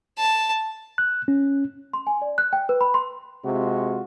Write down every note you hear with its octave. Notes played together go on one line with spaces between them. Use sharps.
A5
F#6
C#4
C6
G#5
D5
F#6
G5
B4
B5
C6
C3 G#3 F4 F#4